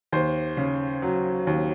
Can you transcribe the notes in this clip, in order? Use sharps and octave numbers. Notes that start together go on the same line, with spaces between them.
D#2 C5
C#3
F#3
D#2